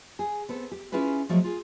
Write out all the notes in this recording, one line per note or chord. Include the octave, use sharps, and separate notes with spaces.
G#4
B3 C4 A4
G4
C#4 E4 F4 G#4 B4
F3 F#3 G#3 A3
F4 G#4